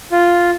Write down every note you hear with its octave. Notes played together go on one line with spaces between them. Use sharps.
F4